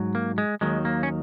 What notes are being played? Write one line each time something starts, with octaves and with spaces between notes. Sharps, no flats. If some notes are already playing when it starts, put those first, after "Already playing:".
Already playing: G#2 F#3
A#3
G#3
D#2 D#3 F#3 G#3
A#3
C#4